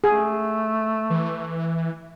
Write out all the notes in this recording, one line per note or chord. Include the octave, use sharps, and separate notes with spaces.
A3 G#4
E3